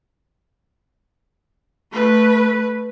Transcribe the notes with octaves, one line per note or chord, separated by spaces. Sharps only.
A3 B4